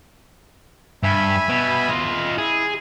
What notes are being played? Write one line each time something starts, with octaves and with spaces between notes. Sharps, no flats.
G2 E5 G#5 B5
B2
F4 D#5
E4 G#4